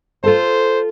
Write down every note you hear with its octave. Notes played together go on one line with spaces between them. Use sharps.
F4 A4 C5 A5